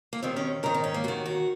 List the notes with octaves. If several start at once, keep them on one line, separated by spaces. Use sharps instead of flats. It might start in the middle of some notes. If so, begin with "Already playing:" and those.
A#3
D#2 D#3 C4
C#4
G#2 D#3 A#4
D#4
C#4
A#3
D#2 D#3 F#4
F#4